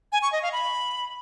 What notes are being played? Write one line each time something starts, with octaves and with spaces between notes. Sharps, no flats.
G#5
C#6
D#5
F5
B5